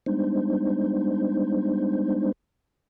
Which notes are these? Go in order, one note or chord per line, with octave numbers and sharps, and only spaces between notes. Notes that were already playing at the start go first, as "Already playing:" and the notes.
G3 G#3 B3 D4 D#4 C5